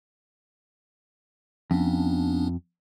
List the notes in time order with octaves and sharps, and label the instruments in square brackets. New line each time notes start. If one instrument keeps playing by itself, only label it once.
[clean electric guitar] F2 [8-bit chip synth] B3 C#4 D4